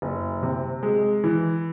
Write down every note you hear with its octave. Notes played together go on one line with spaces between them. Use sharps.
F#1
C3
G#3
E3